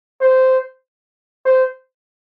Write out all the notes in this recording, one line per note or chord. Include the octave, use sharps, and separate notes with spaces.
C5
C5